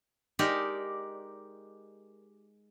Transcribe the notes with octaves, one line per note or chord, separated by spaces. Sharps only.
G#3 D#4 G4 A#4 D5